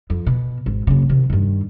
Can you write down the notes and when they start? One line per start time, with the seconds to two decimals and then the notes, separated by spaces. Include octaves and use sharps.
0.10 F2
0.26 B2
0.66 G#1
0.87 F#1 C#3
1.09 C3 D#3
1.30 G2 D#3